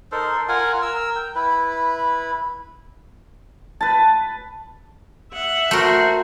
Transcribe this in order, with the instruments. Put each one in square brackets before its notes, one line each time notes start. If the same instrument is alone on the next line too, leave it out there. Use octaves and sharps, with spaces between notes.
[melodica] D#4 A4 A#4 C5
F4 A#4 F#5 G#5
A#4 E6
G5
E4 B4
[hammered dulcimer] B4 A5
[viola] E5 F#5
[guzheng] A3 A#4 [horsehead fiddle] F#4 C5